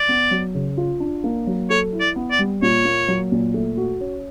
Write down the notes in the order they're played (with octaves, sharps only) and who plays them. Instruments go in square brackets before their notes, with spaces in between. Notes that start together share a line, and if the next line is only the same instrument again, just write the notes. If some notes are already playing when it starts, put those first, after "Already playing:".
Already playing: [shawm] D5
[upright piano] B3
F#3
C#3
F4
D4
A#3
F#3
[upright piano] A4 [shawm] C#5
[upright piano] E4
[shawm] D5
[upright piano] B3
[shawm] D5
[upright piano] G3
[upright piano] A#2 [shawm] C#5
[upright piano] A#3
F#3
A#2
A3
F#4
C#4